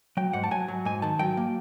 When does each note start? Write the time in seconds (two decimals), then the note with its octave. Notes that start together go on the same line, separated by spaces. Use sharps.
0.17 F#3 G5
0.33 G#2 F#5
0.44 A5
0.51 F#3 G#5
0.68 F#3
0.85 G#2 G#5
1.02 D#3 A5
1.19 F#3 G5
1.37 A#3